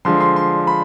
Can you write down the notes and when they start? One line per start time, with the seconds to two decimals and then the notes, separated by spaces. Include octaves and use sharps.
0.05 D3 F3 G#3 C6
0.20 C6
0.36 C6
0.67 B5